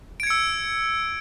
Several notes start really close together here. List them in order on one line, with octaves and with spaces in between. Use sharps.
D7 G#6 C#7 E6